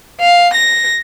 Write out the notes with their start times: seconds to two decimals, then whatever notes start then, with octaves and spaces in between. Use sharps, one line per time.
0.20 F5
0.54 A#6